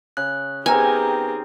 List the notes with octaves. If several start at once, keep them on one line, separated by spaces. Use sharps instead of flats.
C#3 F#6
D#3 B3 C4 G4 G#4 A#4 B4 G#5